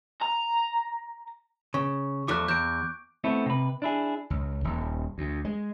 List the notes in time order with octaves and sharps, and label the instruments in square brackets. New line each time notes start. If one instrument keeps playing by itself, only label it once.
[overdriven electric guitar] A#5
[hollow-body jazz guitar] C#3 [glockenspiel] C#6
[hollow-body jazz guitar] E2 F3 A3 [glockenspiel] D6 F#6
[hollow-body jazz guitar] E2 [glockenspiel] G6 D7
[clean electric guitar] A3 B3 C4 E4 A4
C3 B4
D4 E4 G#4
[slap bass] C#2
D#1
D2
G#3